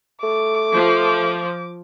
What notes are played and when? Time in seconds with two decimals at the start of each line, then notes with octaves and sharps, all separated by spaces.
0.23 A3 D6
0.75 F3